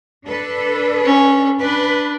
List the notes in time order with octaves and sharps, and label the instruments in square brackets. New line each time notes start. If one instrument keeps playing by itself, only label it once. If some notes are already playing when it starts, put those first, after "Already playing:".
[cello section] D4 A4 B4
[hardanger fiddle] C#4
[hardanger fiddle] D4 [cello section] B4